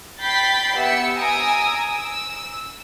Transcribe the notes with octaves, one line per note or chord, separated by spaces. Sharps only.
G5 B5 G6 A6 B6 C7
B3 G4 E5 E6 C#7
G#5 A#5 D#6 E6 D7
E6